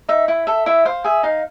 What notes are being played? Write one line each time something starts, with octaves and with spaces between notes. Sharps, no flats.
D#4 E5
E4 E5
A4 E5
E4 E5
C5 F5
G#4 E5
D#4 F5